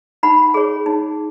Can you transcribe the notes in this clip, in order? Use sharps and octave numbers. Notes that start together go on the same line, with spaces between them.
D#4 F#5 B5
G#4 C#5
D#4